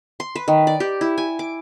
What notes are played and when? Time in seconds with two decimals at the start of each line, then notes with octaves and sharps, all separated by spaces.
0.20 C6
0.35 B4
0.48 D#3
0.67 D5
0.80 G4
1.01 E4
1.18 G#5
1.39 D6